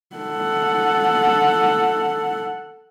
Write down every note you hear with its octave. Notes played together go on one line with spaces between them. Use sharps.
A4 F#5